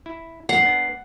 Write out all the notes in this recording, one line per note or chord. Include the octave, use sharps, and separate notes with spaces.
E4
F2 G#2 F#5 C7
B3 D4